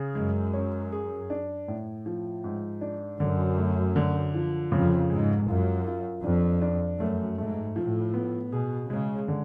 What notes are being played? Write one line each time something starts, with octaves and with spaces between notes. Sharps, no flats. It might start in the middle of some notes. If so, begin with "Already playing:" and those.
Already playing: C#3 G#4
F#2 G#3
C#4
G#4
D4
A2
F3
G#2
D4
F#2 D3
A3
D3
F3
F2 C#3
G#2 G#3
F#2 F4
F4
F2 D4
D4
F#2 A3
G#2 A3
A2 F3
B3
B2 G#4
C#3 G#3
D3